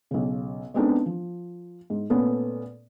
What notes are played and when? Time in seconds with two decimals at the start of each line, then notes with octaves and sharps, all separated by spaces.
0.11 B1 C#3
0.74 G#3 B3 C4 D4 D#4 A4
1.06 F3
1.90 G#2
2.10 A#2 A3 B3 C#4